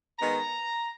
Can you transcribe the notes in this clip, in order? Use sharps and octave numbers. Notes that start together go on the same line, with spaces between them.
D#3 G#3 B3 A#5